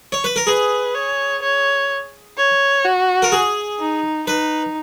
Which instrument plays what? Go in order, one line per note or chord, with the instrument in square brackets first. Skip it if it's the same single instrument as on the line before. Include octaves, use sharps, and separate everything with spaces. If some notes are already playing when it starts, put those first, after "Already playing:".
[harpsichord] C#5
B4
A#4
[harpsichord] G#4 [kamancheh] B4
[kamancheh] C#5
C#5
C#5
F#4
[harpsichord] A#4
G#4
[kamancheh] D#4
[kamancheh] D#4 [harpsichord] B4